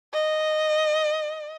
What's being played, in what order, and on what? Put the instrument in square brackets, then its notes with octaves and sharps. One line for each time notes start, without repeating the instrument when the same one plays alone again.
[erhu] D#5